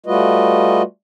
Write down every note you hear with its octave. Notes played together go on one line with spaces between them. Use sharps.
G3 A3 F4 F#4 B4 D#5